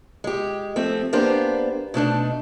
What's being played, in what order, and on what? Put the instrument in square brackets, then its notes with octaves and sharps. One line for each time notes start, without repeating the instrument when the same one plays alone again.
[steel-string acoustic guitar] G#3 G4
F3 A3 C4
A#3 B3 D4 G4 C5
B2 A3 D4 D#4